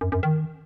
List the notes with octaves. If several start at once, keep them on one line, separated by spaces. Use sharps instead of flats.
F#2
F#2
D#3